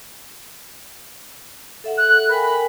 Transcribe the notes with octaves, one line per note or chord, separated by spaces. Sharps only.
A4 E5 F#5
F#6
A#4 G5 G#5 B5